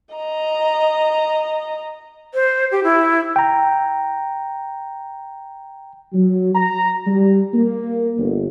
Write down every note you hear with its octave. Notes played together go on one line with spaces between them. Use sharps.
D#5 A#5
C5
G4
E4
G5 A#5
F#3
A#5
G3
A#3
G1